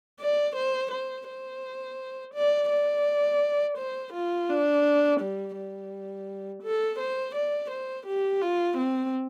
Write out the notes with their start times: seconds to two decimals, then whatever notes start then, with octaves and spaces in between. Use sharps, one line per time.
0.20 D5
0.56 C5
0.92 C5
1.28 C5
2.34 D5
2.70 D5
3.78 C5
4.13 F4
4.49 D4
5.20 G3
5.56 G3
6.63 A4
6.99 C5
7.35 D5
7.71 C5
8.06 G4
8.42 F4
8.78 C4